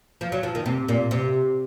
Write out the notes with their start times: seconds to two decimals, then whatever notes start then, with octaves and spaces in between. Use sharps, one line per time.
0.21 F3
0.32 F#3
0.43 F3
0.55 D#3
0.66 C3
0.88 A#2
1.11 C3